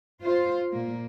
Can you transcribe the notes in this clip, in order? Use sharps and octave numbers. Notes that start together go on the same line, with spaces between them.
F4 C5
A#2 A#3